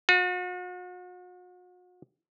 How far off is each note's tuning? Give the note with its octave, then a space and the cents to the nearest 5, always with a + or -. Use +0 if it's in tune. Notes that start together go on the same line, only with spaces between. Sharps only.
F#4 -40